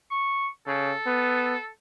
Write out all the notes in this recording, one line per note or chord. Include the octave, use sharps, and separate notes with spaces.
C#6
C#3 A4
B3